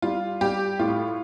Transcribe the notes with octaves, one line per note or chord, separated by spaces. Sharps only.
G3 F4
G3 G4
A2 F4